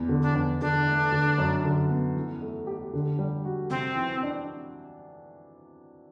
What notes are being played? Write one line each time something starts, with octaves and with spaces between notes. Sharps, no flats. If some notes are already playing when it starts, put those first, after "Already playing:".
Already playing: E2
D3
D4
E2
D3 D4
A3
D3
F#2
D3
B3
E3
A3
G4
D3
G3
F#4
C3 C4
E3
D4